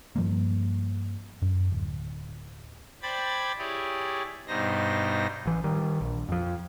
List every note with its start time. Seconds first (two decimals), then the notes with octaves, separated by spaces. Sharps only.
0.16 G2 F3 G3 A#3
1.42 F#2
1.72 D1
3.02 C5 D5 G5 B5 G#6 A6
3.58 E4 G4 G#4 C#5 D5
4.47 G2 B2 D#4 C5 A#6
5.46 A1 E3
5.64 D#3 G3
6.01 A#1
6.29 F2 F3